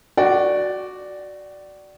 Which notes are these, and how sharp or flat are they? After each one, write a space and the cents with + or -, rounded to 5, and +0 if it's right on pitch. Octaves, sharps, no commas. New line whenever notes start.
F#4 +0 D5 +0 F#5 +45